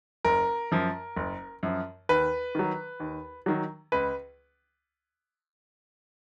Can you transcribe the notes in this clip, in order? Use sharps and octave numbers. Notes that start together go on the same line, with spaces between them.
F#1 A#4
F#2 F3
F#1
F#2 F3
D#2 B4
D#3 F#3
D#2
D#3 F#3
C#2 B4